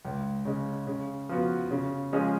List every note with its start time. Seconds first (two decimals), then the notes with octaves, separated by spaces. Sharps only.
0.05 C#2
0.45 C#3 G#3
0.87 C#3
1.29 F3 B3 F#4
1.70 C#3
2.13 F3 G#3 C#4 G#4